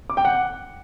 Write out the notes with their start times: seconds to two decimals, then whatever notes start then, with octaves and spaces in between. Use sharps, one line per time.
0.10 D6
0.17 G5
0.25 F#5